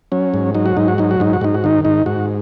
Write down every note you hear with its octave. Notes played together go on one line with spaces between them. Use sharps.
F#3 C#4
G#2
F#3 D#4
F#4
G#2 D#4
F#4
F#3 D#4
F#4
G#2 D#4
F#4
G#2 D#4
F#4
D#3 D#4
G#2 D#4
G#2 F#4